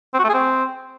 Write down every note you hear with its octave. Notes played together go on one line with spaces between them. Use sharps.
C4
F#4
A3
G#4
C4